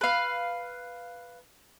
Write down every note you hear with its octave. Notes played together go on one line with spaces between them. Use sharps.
B4 F5